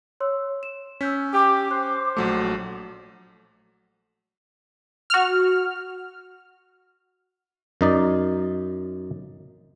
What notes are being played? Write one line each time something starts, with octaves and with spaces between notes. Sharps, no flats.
C#5 C6 E6
E7
C#4 E6 G6 B6
G4 D6
C5 F#6
A#1 F#3 A3
F#4 F6
F#2 D#4 D5